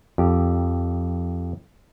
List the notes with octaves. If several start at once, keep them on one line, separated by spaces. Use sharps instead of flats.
F2 G4